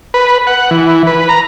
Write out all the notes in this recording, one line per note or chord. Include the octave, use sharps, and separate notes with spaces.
B4
F#5
E3
B4
A#5